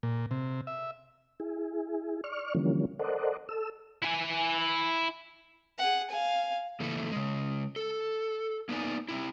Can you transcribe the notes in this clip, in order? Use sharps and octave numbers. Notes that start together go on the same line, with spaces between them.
A#2
C3
E5
E4 G#4
D5 C#6 F6
D3 E3 F3 G3 A#3 C#4
A4 A#4 C5 D5 D#5 F#5
A4 E6
E4 G#5
G#4 F#5
F5 G#5
C#3 E3 A3 A#3 E4 A4
C#3 G#3
A4
A#3 B3 D#4 B4 D5 G#5
C4 E4